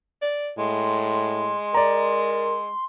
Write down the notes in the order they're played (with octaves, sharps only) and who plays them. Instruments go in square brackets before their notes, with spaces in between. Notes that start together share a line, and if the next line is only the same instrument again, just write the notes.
[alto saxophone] D5
[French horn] A2 [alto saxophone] G#3 [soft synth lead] C6
[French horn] A#4 [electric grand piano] D5 A#5